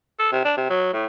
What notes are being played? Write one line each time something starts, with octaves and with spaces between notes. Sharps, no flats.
A4
C3
D4
C3
F#3
A2